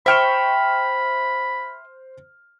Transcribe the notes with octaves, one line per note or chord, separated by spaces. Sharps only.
C5 E5 G5 B5 C#6 F6 E7